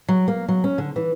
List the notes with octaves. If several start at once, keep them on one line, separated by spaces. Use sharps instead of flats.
F#3
A#3
F#3
C#4
D3
E3